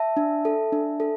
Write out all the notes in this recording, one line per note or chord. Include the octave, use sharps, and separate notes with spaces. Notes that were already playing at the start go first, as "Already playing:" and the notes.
Already playing: E5 A5
D4
A4
D4
A4